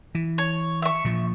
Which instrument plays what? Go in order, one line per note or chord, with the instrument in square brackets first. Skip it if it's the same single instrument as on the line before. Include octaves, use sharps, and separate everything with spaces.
[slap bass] E3
[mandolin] C#5
E5 C#6
[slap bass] A#2 F3